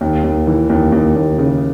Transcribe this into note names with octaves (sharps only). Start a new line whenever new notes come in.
D#2
D#2
E3
D#2
D#2
D#2
C#3